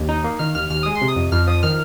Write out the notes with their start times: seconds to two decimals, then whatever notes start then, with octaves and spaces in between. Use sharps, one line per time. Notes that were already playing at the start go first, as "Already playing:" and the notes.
Already playing: D#2
0.09 D#4
0.24 A#3
0.39 D#3 F6
0.55 D#2 F6
0.70 D#2 F6
0.83 G#3 D#6
0.95 C6
1.01 C3
1.08 D#6
1.16 F2
1.32 F2 F6
1.47 F3 D#6
1.63 D#3 F6